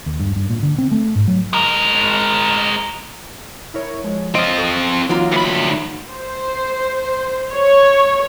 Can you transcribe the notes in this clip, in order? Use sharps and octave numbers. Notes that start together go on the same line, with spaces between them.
D#2
G2
G2
A#2
D3
C4
A3
G#2
F#3
G#3 A#4
E4 A#4 C#5
F3 G#3 C#5
C4 F4 D#5
E2 A4 C#6
E3 F#3 A#3 D#4 F4
D2 B5
C5
C#5